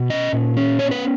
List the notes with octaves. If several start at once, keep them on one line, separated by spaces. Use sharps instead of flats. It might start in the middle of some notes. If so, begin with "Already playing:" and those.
Already playing: B2
C#4 D#5
A#2
C#4
B3 C#5
B4